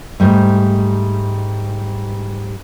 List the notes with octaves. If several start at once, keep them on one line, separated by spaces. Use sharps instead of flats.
G#2 G3 A3